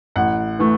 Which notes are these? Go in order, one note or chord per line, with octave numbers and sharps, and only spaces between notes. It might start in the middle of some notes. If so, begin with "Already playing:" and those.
A1 F#5
E3 A3